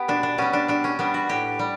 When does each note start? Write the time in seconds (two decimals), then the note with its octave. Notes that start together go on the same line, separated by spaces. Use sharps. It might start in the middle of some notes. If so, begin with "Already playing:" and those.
Already playing: B3 G4
0.08 B2 D4
0.23 D4
0.38 G3 B3 C#4
0.53 D4
0.68 B2 D4
0.84 C#4
0.99 G3 B3 D4
1.14 F#4
1.29 A2 G4
1.59 G3